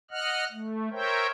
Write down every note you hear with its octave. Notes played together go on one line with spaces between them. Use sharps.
D#5 F#5 F6 F#6
A3
A#4 C5 C#5 E5 G5